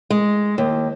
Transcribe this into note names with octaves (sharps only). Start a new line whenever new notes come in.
G#3
D#2